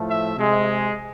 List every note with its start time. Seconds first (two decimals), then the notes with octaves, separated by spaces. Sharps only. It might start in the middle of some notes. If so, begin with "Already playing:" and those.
Already playing: A2 F3 A3
0.08 E5
0.36 C3 G#3